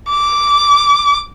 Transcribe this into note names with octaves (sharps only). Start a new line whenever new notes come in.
D6